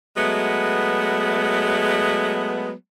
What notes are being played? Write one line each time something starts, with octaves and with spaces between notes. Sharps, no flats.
F#3 G#3 A3 B3